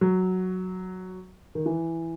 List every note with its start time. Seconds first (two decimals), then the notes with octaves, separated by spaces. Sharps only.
0.01 F#3
1.55 D#3
1.66 E3